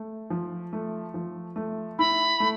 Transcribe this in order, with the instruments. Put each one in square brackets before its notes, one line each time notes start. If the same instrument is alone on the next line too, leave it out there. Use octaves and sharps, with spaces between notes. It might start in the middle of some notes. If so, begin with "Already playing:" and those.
Already playing: [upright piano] A3
F3
A3
F3
A3
[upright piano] E4 [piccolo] B5
[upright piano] A3